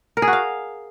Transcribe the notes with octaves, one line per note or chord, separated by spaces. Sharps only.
A#4
G#4
F#4
F5